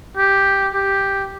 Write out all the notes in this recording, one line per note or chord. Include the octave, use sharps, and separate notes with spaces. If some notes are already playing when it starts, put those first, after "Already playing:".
G4
G4